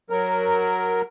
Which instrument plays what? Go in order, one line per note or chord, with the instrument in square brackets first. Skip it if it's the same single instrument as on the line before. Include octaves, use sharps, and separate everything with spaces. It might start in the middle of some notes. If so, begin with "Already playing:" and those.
[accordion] F#3 A#4